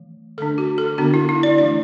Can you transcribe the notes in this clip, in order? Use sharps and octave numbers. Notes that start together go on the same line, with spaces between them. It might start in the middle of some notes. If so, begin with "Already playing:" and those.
Already playing: E3 A3
D3 A3 D4 A4
F#4
A4
D3 B3 D4 F#4
E4
E4
D5
E3 A3 D4 D5